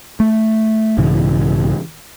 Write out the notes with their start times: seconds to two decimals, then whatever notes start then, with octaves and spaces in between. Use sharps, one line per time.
0.20 A3
0.98 B1 G#2 C#3 E3